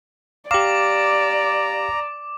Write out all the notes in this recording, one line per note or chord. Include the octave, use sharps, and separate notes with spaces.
G4 D5 F5 A#5 D6